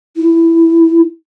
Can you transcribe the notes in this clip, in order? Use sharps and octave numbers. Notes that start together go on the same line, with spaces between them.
E4